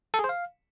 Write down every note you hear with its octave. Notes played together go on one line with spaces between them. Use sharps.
A4
G#4
C5
F5